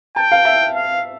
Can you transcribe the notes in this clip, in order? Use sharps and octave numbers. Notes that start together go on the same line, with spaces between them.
G5 A5
F5
E5
F5